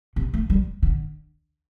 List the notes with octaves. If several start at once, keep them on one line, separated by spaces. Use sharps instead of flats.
C3
A3
G3
D3